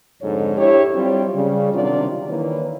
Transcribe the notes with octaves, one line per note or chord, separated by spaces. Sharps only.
F2 G#2 D3 A4 C#5
D4 E4 G4 C#5
F#3 G3 C4 F4 G4
C#3 G3
C3 D#3 F#3 D4 F4 D5
D#3 E3 A#3 E4 B4 C#5